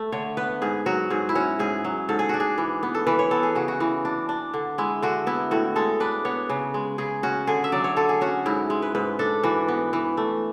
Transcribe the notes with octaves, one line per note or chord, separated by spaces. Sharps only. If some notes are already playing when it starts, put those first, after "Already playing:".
Already playing: A3
D3 C#5
B3 B4
G#2 G#4
F#3 F#4
G#2 G#4
E4
C#4 F#4
G#2 G#4
F#3
G#2 A4
G#4
D4 F#4
G#4
E3
B3
A4
E3 B4
C#5
B3 A4
G#4
C#3 F#4
F#4
E3
D4
D4
D3
G#3 E4
D3 F#4
B3 E4
A2 F#4
G#3 A4
D4 B4
B3 C#5
C#3
G#3
C#3 G#4
C#4 F#4
D3 G#4
E5
F#3 D5
C#5
D3 A4
G#4
C#4 F#4
G#2 E4
G#3
B4
G#2 B4
D4 A4
E3 F#4
B3
E3
A3